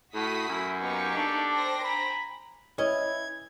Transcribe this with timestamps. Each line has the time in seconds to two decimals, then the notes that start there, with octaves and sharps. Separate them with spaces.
0.14 A2 F#4 D#6 B6
0.49 F#2 E4
0.82 A#3 B3 D#4 G4 C#6
1.17 D4 A4
1.53 C5 G5 A#6
1.83 G#5 A#5 B5
2.78 E3 C#4 E4 C#5 D#5 G#6